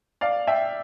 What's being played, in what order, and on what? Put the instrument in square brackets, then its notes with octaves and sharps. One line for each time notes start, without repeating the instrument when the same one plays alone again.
[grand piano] D5 F5
E5 G5